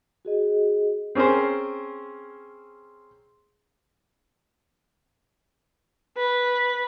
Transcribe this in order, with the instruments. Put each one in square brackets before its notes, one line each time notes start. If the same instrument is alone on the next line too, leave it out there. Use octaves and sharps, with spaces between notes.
[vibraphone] F#4 G#4 D#5
[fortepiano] C4 C#4 G#4 A#4 C5
[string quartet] B4